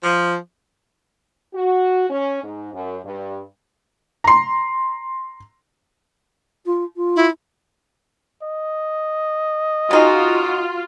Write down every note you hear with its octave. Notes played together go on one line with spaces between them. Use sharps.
F3
F#4
C#4
G#2
F#2
G2
A#5 C6
F4
F4
E4
D#5
C#3 D#4 F4 F#4 G#4